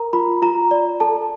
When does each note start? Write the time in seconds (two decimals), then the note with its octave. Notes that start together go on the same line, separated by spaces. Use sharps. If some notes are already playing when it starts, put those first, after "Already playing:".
Already playing: A#4 A#5
0.13 F4 B5
0.42 F4 A#5
0.71 D5
1.00 A4 A5